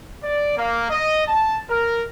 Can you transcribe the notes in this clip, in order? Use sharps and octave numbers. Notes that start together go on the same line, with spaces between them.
D5
A#3
D#5
A5
A#4